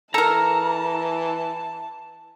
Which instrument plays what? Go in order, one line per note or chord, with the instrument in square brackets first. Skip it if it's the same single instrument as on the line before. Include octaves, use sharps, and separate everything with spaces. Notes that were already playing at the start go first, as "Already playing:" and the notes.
[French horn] E3 [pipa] A4 A#4 [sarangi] A5 [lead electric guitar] A#5